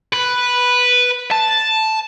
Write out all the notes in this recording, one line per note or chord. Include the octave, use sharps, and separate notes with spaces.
B4
A5